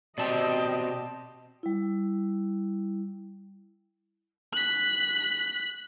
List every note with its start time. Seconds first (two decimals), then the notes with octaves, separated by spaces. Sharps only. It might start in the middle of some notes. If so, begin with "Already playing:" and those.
0.18 B2 C4 G4 D5 D#5 G5 A5
1.63 G3 E4
4.53 F#6 B6